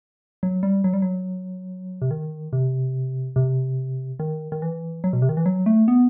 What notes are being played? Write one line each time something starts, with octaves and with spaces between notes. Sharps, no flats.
F#3
G3
F#3
G3
F#3
C3
D#3
C3
C3
D#3
D#3
E3
F#3
B2
C3
D#3
E3
F#3
A3
B3